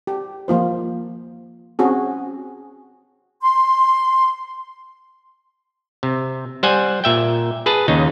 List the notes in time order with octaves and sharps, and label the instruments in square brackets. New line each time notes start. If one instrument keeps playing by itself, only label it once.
[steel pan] G4
F3 A#3 F4 C5
C4 C#4 F#4 G#4
[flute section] C6
[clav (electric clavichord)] C3
G3 C5 F#5 G#5
A#2 E5 G5
G#4 B4 A5
D#2 C#3 D#4